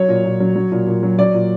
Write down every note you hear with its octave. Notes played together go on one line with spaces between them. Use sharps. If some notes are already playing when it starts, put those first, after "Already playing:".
Already playing: F#3 C#5
A#2
A#2
F#3
F#3
A#2
A#2
F#3
F#3 D5
A#2